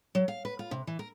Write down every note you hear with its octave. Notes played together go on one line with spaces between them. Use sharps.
F#3
F5
B4
F4
C3
E3
A#4